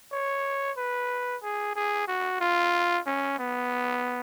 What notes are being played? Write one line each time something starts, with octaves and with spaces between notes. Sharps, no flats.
C#5
B4
G#4
G#4
F#4
F4
C#4
B3